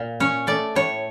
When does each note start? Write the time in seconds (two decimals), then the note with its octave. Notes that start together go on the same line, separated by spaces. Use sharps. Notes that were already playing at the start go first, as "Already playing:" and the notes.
Already playing: A#2
0.20 C#4 C#5
0.47 A3 D5
0.75 A2 C#5